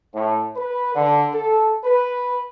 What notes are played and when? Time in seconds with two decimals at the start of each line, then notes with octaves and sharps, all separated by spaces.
0.14 A2
0.57 B4
0.95 D3
1.34 A4
1.84 B4